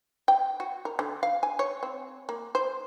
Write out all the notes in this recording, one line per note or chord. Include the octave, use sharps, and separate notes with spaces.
G5
F#4
A#4
D3
F5
G#5
C#5
C4
A#3
C5